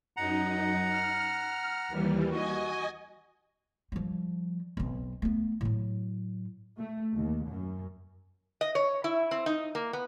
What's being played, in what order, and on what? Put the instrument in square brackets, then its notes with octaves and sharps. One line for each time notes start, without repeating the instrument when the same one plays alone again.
[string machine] F#2 D#4 [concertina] F#5 A#5
[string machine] F6
D#2 E3 G3
[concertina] F#4 [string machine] D#5 G#5
[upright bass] F3 G3
B1 C4
A3 B3
A2 F#3
[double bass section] A3
D#2
F#2
[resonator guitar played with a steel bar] D#5
C#5
E4
C4
D#4
A#3
B3